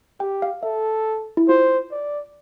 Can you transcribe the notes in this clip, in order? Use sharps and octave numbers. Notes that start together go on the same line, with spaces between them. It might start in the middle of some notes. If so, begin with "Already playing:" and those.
G4 G5
F5
A4 E5
E4
F4 C5
D5